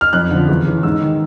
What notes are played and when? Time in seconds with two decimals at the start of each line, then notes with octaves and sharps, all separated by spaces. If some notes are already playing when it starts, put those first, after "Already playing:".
0.01 F6
0.13 F2 F#6
0.31 D3 F3
0.48 E2
0.66 C#3 E3
0.83 G#2 E6
1.01 D#3